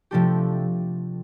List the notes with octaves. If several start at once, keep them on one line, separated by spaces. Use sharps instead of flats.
C3 F3 A3 D4 G4